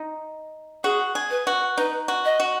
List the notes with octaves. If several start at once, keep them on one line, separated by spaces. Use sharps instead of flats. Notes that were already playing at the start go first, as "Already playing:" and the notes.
Already playing: D#4
F#4 G#4
G#4
B4
F#4
D#4 B4
F#4
D#5
F#4